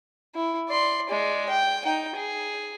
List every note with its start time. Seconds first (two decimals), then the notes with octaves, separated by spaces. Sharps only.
0.35 E4
0.69 D5 C6
1.09 G#3 D5
1.49 G5
1.85 D#4 G5
2.16 G#4